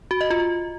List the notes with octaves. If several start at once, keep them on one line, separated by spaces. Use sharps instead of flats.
F#4
D#5
F4